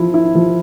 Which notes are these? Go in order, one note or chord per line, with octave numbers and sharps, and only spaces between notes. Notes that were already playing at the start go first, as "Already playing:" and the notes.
Already playing: F3 E4
E4
F3